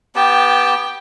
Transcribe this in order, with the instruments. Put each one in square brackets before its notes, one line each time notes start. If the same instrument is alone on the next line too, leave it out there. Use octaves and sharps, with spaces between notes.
[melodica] B3 G4 A5 [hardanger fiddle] G5